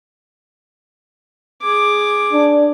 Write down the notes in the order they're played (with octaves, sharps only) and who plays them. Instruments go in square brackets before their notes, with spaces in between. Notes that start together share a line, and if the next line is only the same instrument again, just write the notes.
[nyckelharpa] G#4 D6
[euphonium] D4